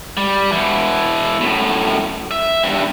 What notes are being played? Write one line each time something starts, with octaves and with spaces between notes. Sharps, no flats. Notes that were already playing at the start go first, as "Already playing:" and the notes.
G3
B2 E3
F#2 A2
E5
E2 G2